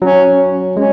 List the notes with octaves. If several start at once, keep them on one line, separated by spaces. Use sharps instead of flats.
F#3 C#4
G#3 C#4